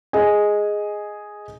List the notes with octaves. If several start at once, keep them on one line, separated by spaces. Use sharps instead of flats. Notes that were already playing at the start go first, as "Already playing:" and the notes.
G#4 D#5 G#5